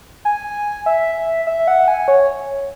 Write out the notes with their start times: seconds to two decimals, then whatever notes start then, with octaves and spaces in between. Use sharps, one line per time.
0.25 G#5
0.86 E5
1.47 E5
1.68 F#5
1.88 G#5
2.08 C#5